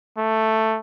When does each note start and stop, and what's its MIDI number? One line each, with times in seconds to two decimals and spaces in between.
0.18 0.79 57